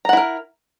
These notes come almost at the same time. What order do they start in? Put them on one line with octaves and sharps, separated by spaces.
A#5 F#5 E4 A#4